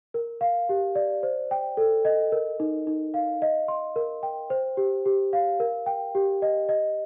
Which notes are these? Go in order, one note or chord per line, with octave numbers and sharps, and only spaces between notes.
A#4
F5
G4
D5
C5
G5
A4
D#5
A#4
D#4
D#4
F5
D#5
C6
A#4
G5
C5
G4
G4
F5
A#4
G5
G4
D#5
D#5